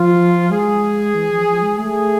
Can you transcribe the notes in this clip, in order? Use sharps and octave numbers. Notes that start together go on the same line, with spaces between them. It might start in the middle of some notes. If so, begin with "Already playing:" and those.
Already playing: F3 F4
G#3 G#4
E3
F3
F3
G#3
A3 G#4